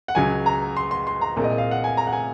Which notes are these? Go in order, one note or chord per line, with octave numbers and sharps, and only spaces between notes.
F#5
C#2 C#3 F#3 G#5
A#5
C6
C6
C6
A#5
C2 A#2 G#3 C4
D#5
F5
F#5
G#5
A#5
F#5
G#5